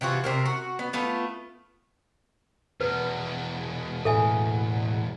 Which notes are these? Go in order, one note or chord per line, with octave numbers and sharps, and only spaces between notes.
C3 E3 F4 F#4
C3 C4 A#4
F#4
B3
A3 B3 F4
E2 B2 B4
A2 A4 E5 G#5